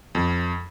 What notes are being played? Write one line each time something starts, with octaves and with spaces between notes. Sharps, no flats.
F2